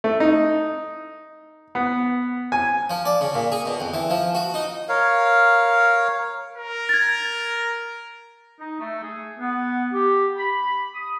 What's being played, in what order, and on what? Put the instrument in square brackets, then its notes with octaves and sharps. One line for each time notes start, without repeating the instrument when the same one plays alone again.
[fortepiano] A3
D#4
B3
G#5
[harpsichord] F3
D5
C#3
A#2
G#4
B2
F2
E3
F3
F#4
D#4
[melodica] A#4 C#5 F5
[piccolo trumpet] A#4
[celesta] G#6 A6
[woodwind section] D#4
A3
G#4
B3
G4
B5
D#6